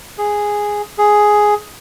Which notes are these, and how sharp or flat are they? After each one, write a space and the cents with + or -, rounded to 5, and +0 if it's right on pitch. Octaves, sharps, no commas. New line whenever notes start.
G#4 -5
G#4 +5